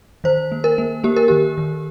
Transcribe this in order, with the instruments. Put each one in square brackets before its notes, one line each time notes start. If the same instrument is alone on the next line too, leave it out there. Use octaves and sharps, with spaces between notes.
[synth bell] D#3 C5
A#3
A#4
A#3
A#3 G4
A#4
D#3 G4
D#3